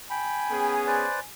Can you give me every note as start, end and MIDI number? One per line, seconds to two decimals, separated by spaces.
0.10 0.75 79
0.10 1.27 80
0.10 0.75 83
0.51 1.05 59
0.51 1.05 61
0.51 1.05 68
0.87 1.20 71
0.87 1.20 72
0.87 1.20 74